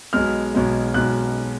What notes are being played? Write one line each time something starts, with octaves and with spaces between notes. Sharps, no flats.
B1 B2 G#3 F6
B1 B2 G#3
B1 B2 G#3 F#6